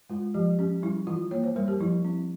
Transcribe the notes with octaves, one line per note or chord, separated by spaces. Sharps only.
G#3 F4
F3 G4
C#4 G4
G3 E4
E3 F4
A#3 C#5
C5
G3 A#4
G4
F3 E4
C4